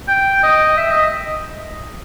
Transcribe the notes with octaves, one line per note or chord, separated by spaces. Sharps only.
G5
D#5
E5
D#5